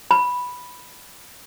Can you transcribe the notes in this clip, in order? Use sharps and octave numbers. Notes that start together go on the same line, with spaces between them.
B5